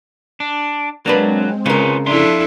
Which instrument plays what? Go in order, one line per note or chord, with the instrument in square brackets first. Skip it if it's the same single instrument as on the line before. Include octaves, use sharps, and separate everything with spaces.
[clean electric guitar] D4
[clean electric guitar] F#3 [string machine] G#3 C4 [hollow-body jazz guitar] A#3 D4 B4
[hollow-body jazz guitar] C#3 A#4 [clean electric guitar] F4 B4 C#5
[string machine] F2 F#6 [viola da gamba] D4 E4 A4 [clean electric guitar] E5 F5 C6